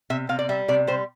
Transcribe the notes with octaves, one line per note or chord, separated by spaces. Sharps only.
C3 E5
C3 F5
D5
G3 E5
C3 D5
G3 C5